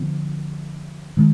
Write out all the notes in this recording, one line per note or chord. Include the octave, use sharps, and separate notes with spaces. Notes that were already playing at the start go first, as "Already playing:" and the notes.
Already playing: D3 F3 B3
D#3 G#3